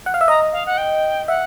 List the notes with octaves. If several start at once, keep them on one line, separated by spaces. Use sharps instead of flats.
F#5
F5
E5
D#5 A#5
F5
F#5
G5
E5 F#5